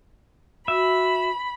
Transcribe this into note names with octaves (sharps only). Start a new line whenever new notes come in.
F#4 E5 B5